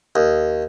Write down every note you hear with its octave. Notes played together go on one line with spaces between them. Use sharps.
D#2